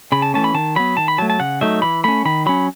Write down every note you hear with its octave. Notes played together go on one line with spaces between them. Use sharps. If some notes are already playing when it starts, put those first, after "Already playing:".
C#3 B5
A5
E3 A3 C#4 A5
B5
D#3 A5
F#3 B3 B5
D#3 A5
B5
F#3 A3 A5
A5
C#3 F#5
F#3 A3 D#4 E5
E3 B5
A3 C#4 B5
D#3 B5
F#3 C#4 B5